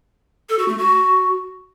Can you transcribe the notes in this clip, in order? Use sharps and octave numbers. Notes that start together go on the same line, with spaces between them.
A4
F#4
A3
F#4